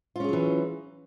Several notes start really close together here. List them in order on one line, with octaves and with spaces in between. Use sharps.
F4 C#4 G#4 F#3 E3